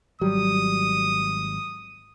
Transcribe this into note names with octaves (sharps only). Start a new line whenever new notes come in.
G#1 F#3 G3 D#6